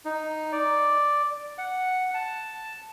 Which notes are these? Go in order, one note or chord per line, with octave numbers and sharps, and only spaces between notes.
D#4
D5
F#5
A5